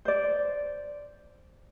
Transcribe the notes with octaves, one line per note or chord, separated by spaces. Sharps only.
C5 D5